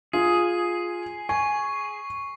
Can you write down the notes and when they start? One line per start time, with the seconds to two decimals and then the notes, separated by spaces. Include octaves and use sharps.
0.13 F4 G#4 C7
1.29 G#5 C#6